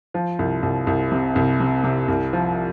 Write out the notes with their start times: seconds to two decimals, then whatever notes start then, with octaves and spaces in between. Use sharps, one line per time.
0.14 F3
0.39 C2
0.63 C2
0.87 C2
1.12 C3
1.36 C2
1.60 C3
1.84 C3
2.08 C2
2.33 F3